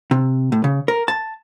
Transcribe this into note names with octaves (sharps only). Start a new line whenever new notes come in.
C3
A2
C#3
A#4
A5